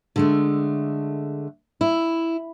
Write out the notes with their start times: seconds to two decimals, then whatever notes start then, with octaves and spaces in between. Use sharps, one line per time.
0.16 D3 G#3 A3
1.81 E4